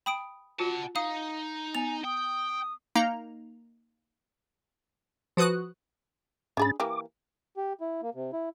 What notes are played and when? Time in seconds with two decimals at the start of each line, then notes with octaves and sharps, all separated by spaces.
0.06 G5 B5 D#6 D7
0.59 F4 F#4 F#5 A5
0.96 D#4 F5 D#6
1.75 B3 G#5 F7
2.05 G5 D#6
2.95 A#3 D#4 F5 A#5
5.37 F3 F#4 B4 D#6 F#6
6.57 G#2 C#4 D4 G#4 B5 A6
6.80 E3 A#3 G4 D6
7.57 G4
7.81 E4
8.03 A#3
8.15 C3
8.33 E4